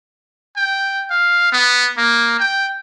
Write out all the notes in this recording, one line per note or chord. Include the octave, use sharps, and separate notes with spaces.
G5
F5
B3
A#3
G5